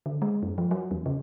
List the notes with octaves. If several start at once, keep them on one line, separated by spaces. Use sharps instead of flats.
D3
G#3
F#2
F3
F#3
E2
C#3